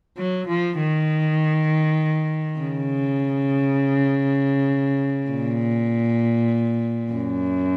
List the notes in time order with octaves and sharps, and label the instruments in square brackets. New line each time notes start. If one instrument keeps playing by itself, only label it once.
[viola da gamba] F#3
F3
D#3
C#3
A#2
F#2